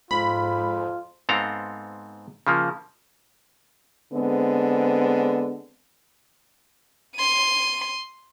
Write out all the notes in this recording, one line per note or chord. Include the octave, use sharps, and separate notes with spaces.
F2 G#2 F4 B5
G#2 B3 C4 A4 F5 A#5
C#3 F3 A#3
D3 G#3 B3 C4
C6 D#7